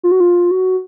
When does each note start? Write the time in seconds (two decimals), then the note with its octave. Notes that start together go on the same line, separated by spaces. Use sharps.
0.03 F4
0.12 F#4
0.20 F4
0.51 F#4